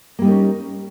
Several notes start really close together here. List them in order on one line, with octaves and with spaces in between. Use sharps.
A#3 G3 D#4 A#4 C#4